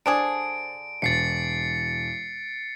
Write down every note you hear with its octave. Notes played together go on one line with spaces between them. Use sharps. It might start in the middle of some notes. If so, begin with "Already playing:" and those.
D3 D4 G#4 C5 A5 D7
E1 A6 C7 C#7